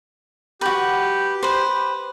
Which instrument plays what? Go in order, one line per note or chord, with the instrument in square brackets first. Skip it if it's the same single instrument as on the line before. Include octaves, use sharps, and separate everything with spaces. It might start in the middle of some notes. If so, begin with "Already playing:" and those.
[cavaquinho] F#4 B4 [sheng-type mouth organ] G4
[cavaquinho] B4 C5